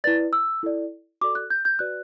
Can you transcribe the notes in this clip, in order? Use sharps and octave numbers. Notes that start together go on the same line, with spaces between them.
E4 B4 D5 A6
E6
E4 A4 D5
F#4 A4 D5 D6
F#6
G6
G6
F#4 B4 D5 F#6